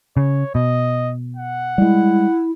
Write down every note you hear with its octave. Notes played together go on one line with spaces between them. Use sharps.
C#3 C#5
B2 D#5
F#5
G3 G#3 E4